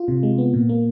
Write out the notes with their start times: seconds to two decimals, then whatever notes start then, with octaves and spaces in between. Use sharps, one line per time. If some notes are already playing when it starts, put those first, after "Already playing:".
Already playing: F4
0.08 C3
0.23 G#3
0.38 B3
0.54 A#2
0.69 A#3